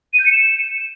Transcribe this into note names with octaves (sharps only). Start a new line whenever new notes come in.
D#7
G6
C#7
E7